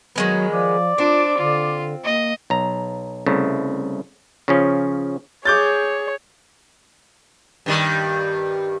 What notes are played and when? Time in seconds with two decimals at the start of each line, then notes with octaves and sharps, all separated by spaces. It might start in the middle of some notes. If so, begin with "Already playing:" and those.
0.16 D#3 F#3 G#3 B3
0.51 F3 D5
0.98 C4 D4 F4 D6
1.38 D3 F4
2.05 A#3 D#5
2.50 B1 A#5
3.26 C2 C#3 A3
4.48 C#3 F3 C#4
5.45 G#4 C#5 D6 G6 A6
7.66 G2 D#3 G3